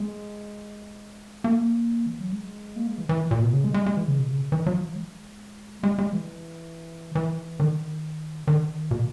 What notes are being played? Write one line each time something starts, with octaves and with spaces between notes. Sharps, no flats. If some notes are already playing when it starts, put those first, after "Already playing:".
Already playing: G#3
A#3
E3
F#3
G#3
A#3
G#3
E3
E3
A#2
B2
C#3
G#3
G#3
G#3
E3
C#3
B2
C#3
E3
F#3
E3
G#3
G#3
G#3
E3
E3
D#3
D#3
B2